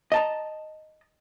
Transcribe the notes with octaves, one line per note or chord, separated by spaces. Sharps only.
D#5 A5 A#5